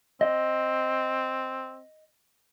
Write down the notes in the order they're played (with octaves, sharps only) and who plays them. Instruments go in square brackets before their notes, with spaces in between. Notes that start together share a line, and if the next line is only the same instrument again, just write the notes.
[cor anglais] C4 [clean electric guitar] D#5